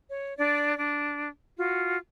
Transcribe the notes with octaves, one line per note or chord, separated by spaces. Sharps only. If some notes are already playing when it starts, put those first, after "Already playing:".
C#5
D4 D5
D4
F4 F#4